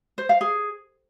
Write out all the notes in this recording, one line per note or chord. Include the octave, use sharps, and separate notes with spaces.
C5
F5
G#4